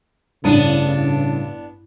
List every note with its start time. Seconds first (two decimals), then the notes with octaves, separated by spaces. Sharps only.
0.44 A1 G2 C#3 B3 D4 D#7